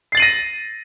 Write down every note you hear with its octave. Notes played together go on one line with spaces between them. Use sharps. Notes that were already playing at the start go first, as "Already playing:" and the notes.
A6 A#6 C7 D#7 F#7